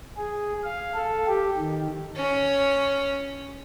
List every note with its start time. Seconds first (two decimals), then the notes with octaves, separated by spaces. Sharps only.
0.17 G#4
0.64 F5
0.94 A4
1.27 G4
1.57 D#3
2.16 C#4 C#5